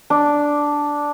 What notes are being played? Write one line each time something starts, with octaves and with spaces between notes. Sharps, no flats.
D4